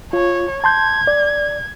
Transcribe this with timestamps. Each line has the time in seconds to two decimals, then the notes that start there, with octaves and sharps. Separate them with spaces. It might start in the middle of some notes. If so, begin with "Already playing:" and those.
0.13 F4 C#5
0.64 A5 C6 G6 G#6
1.07 D5